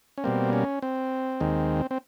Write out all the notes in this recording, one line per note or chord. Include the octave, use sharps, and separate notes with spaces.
C#4
B2 G3 A#3 C4
C#4
C4
D#2 D#3 G#3
C4